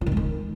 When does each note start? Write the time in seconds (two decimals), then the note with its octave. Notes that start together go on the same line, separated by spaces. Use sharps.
0.01 F3
0.06 D#3
0.12 G#3
0.17 D#3